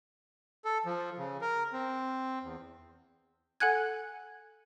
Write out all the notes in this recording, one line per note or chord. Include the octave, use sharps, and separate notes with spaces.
A4
F3
C#3
A#4
C4
E2
A4 F#5 G#5 F#6 G#6